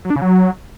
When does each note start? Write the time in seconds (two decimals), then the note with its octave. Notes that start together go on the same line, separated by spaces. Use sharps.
0.05 F#3
0.10 D4
0.16 C#3
0.22 F#3